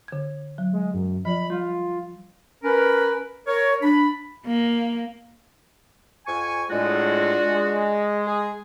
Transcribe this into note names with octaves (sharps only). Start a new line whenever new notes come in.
D3 G#6
F#3
G#3
F#2
F3 F4 D5 B5
G3 F4
C#4 A#4 B4
A#4 C#5
D4 B5
A#3
F2 G#5 C#6
A2 G#3 D4 F4 F#4
G#3
G#4